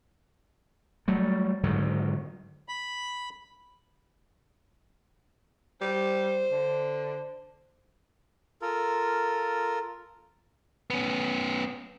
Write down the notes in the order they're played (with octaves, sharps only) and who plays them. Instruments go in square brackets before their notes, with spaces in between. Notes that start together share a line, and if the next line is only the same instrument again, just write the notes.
[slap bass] F#3 G3 A3
G#2 D3 D#3 F#3
[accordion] B5
[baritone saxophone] G3 [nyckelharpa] C5
[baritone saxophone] D3
[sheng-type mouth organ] F4 A4 A#4
[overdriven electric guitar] B3 C#4